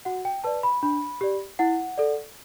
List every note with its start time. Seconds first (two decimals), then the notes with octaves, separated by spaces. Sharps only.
0.05 F#4 F#5
0.25 G5
0.44 B4 D5 A5
0.63 B5
0.83 D4 B5
1.21 G4 D5
1.59 E4 F#5
1.98 A4 D5